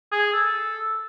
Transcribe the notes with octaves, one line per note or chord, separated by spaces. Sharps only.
G#4
A4